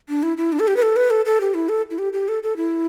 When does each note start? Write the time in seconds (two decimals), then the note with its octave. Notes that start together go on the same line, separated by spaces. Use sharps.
0.09 D4
0.23 E4
0.37 E4
0.52 D4
0.59 A4
0.67 G4
0.76 B4
0.82 A4
0.96 B4
1.10 A4
1.25 A4
1.41 G4
1.54 E4
1.69 A4
1.90 E4
1.98 G4
2.13 G4
2.28 A4
2.43 A4
2.56 E4